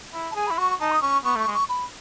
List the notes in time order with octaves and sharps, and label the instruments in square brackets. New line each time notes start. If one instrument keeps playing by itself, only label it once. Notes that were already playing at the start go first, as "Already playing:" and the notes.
[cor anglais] E4
[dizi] A5
[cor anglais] G#4 [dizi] G#5
[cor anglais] E4 [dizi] B5
[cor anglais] F#4 [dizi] C#6
[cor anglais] D#4 [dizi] A5
[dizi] D#6
[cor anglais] C#4 [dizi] C#6
[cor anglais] B3 [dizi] C#6
[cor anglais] A3
[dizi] C#6
[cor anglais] G#3
[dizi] C#6
B5